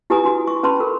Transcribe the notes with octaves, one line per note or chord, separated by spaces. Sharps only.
E4 G4 B4 G#5 A#5 D#6
D4 F#4
C#6
C#4 B4 A5 B5 C6
A4 A#4